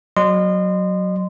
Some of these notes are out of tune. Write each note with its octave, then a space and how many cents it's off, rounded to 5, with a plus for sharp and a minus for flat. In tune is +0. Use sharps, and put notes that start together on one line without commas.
F#3 +0 D#5 -35 C6 -15